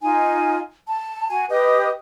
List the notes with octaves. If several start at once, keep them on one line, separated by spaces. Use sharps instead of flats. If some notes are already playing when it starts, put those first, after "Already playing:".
D#4 F4 G#5
A5
F#4 G#5
G4 B4 D#5 D#6